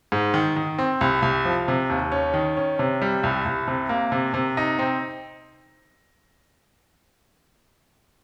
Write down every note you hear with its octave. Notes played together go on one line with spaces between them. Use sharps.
G#2
D#3
D#3
C4
C2
C2
F3
C3
D#2
C#4
D#3
C#4
C3
G3
C2
C2
C3
A#3
C3
C3
D#4
C4